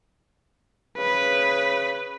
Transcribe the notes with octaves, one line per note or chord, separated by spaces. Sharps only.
C#3 B4